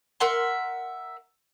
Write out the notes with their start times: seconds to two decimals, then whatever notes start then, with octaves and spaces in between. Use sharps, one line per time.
0.20 A#4 E5 F#5 C6